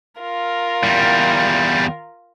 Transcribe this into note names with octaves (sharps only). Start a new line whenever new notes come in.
F4 A#4
E2 G3